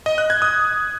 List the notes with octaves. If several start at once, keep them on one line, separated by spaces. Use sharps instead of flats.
D#5
F#6
G#6
D#6